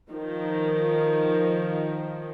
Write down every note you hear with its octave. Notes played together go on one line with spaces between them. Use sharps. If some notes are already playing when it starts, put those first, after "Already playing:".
D#3 F3